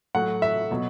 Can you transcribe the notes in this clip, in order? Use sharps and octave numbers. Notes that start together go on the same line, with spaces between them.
A2 F#3 A3 F#5
E5
B2 F#3